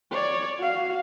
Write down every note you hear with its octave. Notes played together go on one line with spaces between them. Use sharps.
C#5 D5
F#4 F5